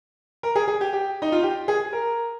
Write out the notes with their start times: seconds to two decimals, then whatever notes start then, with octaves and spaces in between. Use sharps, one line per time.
0.43 A#4
0.56 G#4
0.68 G#4
0.81 G4
0.93 G4
1.22 D#4
1.32 F4
1.43 G4
1.68 G#4
1.93 A#4